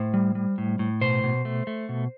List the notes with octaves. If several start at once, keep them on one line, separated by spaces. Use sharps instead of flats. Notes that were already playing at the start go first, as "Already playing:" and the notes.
Already playing: A2 C5
G3
G3
A2
A2
B2 C5
B2
A3
A3
B2